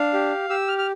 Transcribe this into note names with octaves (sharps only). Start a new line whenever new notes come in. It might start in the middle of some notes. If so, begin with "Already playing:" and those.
Already playing: D4 F5
G4
G4 E6
F6
F6